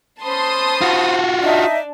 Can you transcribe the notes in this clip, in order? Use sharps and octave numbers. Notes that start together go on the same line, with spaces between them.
C#4 C5 A5 B5 C6 D#6
F4 F#4
D4 D#4 D#5 E5